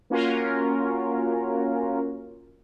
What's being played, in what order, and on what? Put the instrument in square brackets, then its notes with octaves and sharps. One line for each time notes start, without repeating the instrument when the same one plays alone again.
[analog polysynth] A#3 C#4 F4 F#4 A#4